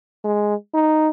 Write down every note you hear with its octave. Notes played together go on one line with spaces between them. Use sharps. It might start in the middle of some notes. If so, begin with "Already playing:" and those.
G#3
D#4